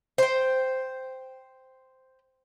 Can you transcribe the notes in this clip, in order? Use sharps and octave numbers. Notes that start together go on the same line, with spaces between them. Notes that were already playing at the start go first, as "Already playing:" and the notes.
C5 G5